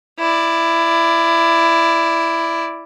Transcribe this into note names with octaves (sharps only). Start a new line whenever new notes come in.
E4 D5